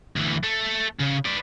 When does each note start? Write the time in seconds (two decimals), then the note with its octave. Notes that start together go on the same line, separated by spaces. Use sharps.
0.16 D2 E3
0.43 A3
1.00 C#3
1.26 B4 D5